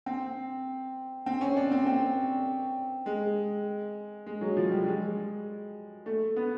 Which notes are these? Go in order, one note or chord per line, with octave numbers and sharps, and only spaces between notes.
C4
C4
C#4
D4
C4
C4
G#3
G#3
F#3
F3
G3
G#3
A3
B3